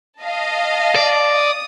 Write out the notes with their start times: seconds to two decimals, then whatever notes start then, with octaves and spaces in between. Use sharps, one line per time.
0.24 D#5 F5 A5
0.95 D5
1.34 D#6